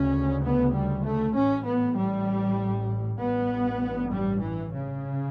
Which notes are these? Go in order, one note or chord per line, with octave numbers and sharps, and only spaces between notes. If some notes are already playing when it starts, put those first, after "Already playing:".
Already playing: D2 C#3 C#4
B3
G3
A3
A1 A2 C#4
B3
G3
A1 G2 B3
G3
E3
C#3